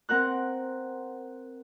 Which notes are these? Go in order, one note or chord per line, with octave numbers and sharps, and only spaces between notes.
C4 A#4 F#5 F#6